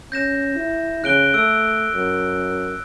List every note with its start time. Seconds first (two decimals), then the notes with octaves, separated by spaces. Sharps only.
0.12 C#4 G6 A#6 E7
0.56 E4
1.04 C#3 F#6 D7 G7
1.34 A3 E6 D7
1.93 F#2